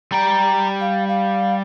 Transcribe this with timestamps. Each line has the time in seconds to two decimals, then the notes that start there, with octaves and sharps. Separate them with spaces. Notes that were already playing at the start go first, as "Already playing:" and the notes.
0.12 G3 G5 A#5
0.81 F5
1.08 F5